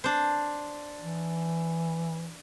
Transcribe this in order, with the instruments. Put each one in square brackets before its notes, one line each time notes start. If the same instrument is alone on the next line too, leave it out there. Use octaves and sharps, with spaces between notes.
[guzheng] D4 C5
[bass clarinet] E3